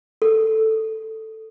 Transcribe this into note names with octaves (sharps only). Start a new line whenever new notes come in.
A4